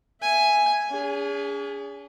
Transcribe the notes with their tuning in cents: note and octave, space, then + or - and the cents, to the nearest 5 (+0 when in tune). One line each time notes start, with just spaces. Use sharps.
E5 +5 G#5 +0
C#4 +45 G#4 -15